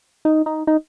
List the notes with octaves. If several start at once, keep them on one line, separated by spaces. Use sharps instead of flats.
D#4
D#4
D#4